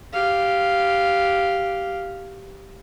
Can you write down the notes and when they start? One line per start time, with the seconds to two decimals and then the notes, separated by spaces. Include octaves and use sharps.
0.13 G4 F5